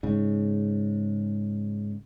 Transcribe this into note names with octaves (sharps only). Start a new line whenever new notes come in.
G#2 C#3